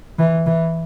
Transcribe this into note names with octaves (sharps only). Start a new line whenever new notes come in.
E3
E3